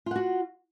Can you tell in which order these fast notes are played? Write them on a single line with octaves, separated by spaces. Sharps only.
F4 F#5 F#4